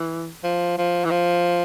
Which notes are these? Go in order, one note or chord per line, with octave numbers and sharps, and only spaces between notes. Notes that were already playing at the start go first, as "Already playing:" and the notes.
Already playing: E3
F3
F3
E3
F3